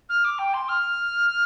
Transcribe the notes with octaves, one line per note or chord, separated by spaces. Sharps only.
F6
D6
G5
C6
F6